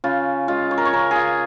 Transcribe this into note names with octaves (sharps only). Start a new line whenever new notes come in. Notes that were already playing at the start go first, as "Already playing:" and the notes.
C#3 F4
G#3 F4
C#5
A#4
C#5
C#3 A#4
F4 G#4